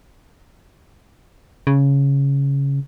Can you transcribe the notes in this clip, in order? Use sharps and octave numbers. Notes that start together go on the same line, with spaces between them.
C#3